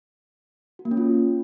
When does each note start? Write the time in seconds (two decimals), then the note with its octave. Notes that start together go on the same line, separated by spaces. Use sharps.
0.79 F#4
0.85 A#3
0.91 C#4
0.97 F4